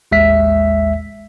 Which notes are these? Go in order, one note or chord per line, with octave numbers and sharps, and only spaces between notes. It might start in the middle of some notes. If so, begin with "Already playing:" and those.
A1 D#2 G#3 E5 B6